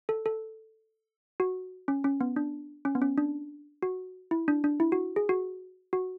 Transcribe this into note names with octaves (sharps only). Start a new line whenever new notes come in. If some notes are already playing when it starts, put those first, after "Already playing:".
A4
A4
F#4
C#4
C#4
B3
D4
C#4
B3
C#4
D4
F#4
E4
D4
D4
E4
F#4
G#4
F#4
F#4